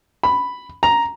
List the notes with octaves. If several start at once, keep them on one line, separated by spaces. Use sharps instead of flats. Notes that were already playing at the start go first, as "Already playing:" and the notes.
B5
A#5